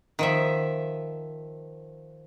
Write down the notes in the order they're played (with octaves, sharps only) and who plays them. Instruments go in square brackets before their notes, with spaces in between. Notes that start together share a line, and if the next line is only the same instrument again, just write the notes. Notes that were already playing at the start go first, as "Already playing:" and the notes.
[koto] D#3 F3 E5